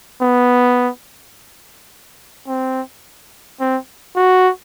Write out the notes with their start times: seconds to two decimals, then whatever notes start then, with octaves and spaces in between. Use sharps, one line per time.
0.22 B3
2.47 C4
3.60 C4
4.16 F#4